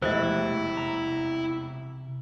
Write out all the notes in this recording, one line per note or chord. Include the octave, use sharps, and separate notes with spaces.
E1 C2 F2 A3 E4 G4 C5 D#5
C3 A#5